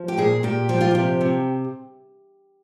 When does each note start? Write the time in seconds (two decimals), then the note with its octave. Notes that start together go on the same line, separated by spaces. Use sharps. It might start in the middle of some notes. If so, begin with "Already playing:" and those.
Already playing: F3
0.08 G4
0.18 A#2 G#4
0.43 A#2 G4
0.69 F3 G4
0.81 F4
0.91 C3 G4
1.21 C3